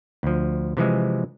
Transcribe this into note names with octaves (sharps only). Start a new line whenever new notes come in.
D2 F3
C3 E3 F3 G#3